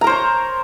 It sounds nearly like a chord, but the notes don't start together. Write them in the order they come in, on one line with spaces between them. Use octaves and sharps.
A#5 A#4 C5 C#5